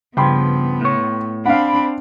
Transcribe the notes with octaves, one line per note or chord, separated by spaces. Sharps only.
G2 C#3 F3 B3 G5 B5 C6
A2 C#5
C4 D4 F5 F#5 B5